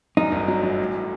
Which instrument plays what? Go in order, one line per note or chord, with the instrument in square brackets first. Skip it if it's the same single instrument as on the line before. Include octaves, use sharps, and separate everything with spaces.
[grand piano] F#2 [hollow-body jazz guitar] D#4
[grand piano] G1
F#3
F#2
A1
A2